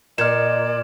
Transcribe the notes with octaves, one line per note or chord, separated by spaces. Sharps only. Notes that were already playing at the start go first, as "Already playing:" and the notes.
A#2 D5 D#5 F6 G#6 E7